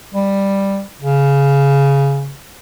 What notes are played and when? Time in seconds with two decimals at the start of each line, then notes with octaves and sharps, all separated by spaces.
0.14 G3
1.01 C#3